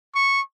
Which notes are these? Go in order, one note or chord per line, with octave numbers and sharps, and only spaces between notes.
C#6